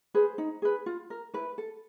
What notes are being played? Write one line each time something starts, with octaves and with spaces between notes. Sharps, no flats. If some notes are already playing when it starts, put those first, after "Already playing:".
G#4 B4 C5
D#4
G#4 B4
F4
A#4
E4 B4
A4